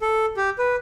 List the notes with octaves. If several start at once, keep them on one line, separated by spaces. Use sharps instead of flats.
A4
G4
B4